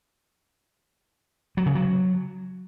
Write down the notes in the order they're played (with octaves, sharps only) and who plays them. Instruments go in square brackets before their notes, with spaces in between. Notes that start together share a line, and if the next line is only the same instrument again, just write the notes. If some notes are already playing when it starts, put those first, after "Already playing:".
[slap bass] F#3
C#3
F#3